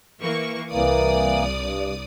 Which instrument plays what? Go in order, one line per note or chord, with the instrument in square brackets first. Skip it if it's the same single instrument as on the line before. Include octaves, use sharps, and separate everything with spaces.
[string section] E3 A#3 C#6
[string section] C2 D5 D#6 [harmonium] E3 A#3
[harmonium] G2